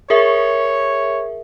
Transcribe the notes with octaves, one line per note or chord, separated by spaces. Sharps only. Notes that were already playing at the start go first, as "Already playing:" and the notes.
G#4 A#4 C#5 E5